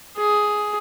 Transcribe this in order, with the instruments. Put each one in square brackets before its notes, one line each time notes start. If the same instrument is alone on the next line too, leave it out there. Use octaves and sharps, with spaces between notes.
[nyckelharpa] G#4